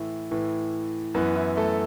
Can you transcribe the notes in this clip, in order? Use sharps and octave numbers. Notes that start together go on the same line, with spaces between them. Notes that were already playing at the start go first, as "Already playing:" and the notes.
Already playing: A2 E3 E4
A2 E3
F#2 E3 B3 B4
E4
A3 A4